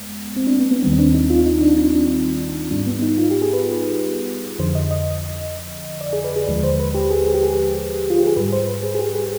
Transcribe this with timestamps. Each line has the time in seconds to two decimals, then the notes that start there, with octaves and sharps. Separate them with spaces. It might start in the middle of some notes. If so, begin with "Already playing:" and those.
Already playing: F2 G#3 B3
0.36 C4
0.47 D4
0.59 B3
0.71 B3
0.82 D#2 D#3 G3 C4
0.93 C4
0.99 D4
1.14 D#4
1.30 F4
1.46 D#4
1.61 D4
1.77 D4
1.85 D#4
1.93 D4
2.71 G#2 G3 D4
2.86 B3
3.02 D#4
3.18 F4
3.31 G4
3.42 G#4
3.53 B4
4.59 F2 D3 F3 C5
4.75 D#5
4.91 D#5
6.01 D5
6.13 G#4
6.24 B4
6.36 G#4
6.48 D#2 D3 F3 G#3 B4
6.63 C5
6.79 B4
6.94 G4
7.11 G#4
7.27 G#4
7.34 G4
7.43 G#4
8.10 F4
8.19 G4
8.27 G#4
8.36 G#2 G3 B4
8.52 C5
8.67 B4
8.83 G#4
8.95 G#4
8.99 G4
9.15 G#4